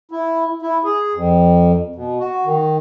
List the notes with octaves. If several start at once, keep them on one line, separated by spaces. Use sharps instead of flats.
E4
E4
G#4
F2
B2
F#4
D#3